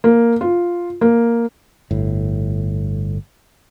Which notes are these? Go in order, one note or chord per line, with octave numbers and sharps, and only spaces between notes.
A#3
F4
A#3
G1 A2